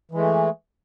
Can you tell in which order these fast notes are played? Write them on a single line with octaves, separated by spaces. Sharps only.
E3 G#3 A3